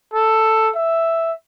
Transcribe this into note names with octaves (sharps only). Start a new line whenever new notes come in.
A4
E5